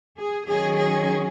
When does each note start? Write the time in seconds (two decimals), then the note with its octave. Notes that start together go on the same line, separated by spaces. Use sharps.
0.17 G#4
0.47 D#3 F#3 C#4 G#4
0.77 G#4